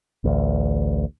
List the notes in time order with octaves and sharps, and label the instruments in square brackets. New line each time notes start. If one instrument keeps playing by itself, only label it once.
[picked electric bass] A1 D2